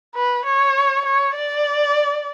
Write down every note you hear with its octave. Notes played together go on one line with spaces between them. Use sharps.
B4
C#5
C#5
D5